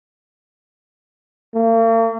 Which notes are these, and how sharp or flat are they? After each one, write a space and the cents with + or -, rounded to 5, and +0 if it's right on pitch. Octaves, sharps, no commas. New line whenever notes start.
A#3 -45